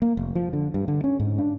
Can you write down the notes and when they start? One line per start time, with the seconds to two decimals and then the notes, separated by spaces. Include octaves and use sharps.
0.02 A#3
0.17 F1
0.35 F3
0.53 D3
0.74 G2
0.88 D3
1.04 C#4
1.20 G#2
1.38 D4